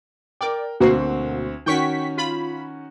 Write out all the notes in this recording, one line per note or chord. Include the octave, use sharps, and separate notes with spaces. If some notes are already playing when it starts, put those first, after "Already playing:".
A#4 D5 G5
D2 B2 A#3 C4 F#4 C7
D#3 C#4 F#4 G5 C#6 B6
F4 B5